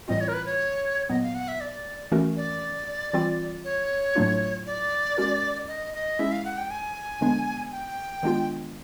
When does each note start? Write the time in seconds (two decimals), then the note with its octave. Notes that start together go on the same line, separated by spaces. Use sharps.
0.08 A2 E3 G3 C4 F4 D#5
0.21 C#5
0.28 A#4
0.34 B4
0.46 C#5
1.09 A#2 F#3 B3 D#5
1.22 F5
1.35 F#5
1.48 E5
1.61 D5
2.12 E3 A3 C#4 F#4 A#4
2.37 D5
3.13 E3 G3 C4 F4
3.65 C#5
4.15 A2 F#3 A3 D4 F4
4.66 D5
5.17 G#3 C#4 F#4 A#4
5.68 D#5
5.94 D#5
6.19 G#3 C#4 E4 G#4 E5
6.32 F5
6.45 F#5
6.57 G5
6.71 G#5
7.21 D3 F3 G#3 B3 D4
7.72 G5
8.23 D#3 G#3 B3 D4 F4